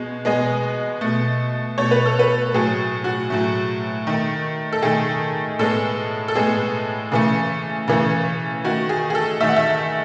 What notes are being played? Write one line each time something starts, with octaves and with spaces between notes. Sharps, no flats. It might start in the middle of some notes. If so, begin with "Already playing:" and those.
Already playing: B2 G#3
B2 G#3 B3 D#5
B2 A3
B2 A3 C#5
B4
A4
B4
A2 F#3 A3 G#4
F#4
A2 F#3 A3
D#3 A3
A4
D#3 A3 G#4
A2 G#3 B3 A4
A4
A2 G#3 B3 G#4
C#3 E3 A3
C#3 E3 A3
D#3 A3 F#4
G#4
G#4
A4
D#3 A3 E5
F#5
E5